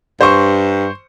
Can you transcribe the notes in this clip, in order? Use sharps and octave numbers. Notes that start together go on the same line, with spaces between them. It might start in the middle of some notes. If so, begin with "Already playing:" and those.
G2 C5 C#6